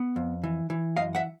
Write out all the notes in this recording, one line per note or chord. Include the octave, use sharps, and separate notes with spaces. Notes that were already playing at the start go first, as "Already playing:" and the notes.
Already playing: B3
F2
E3
E3
F#2 D#5 F5
E5 F#5